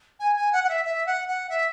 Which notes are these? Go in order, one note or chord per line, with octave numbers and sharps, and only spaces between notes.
G#5
G#5
F#5
F#5
E5
E5
F#5
F#5
E5